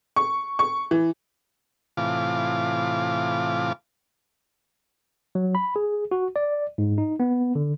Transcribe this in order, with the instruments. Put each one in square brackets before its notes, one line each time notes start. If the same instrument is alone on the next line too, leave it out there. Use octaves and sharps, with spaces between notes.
[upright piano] C#6
C#6
E3
[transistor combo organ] A2 C3 E3 F4 F5 D6
[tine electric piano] F#3
B5
G#4
F#4
D5
G#2
D#4
B3
D3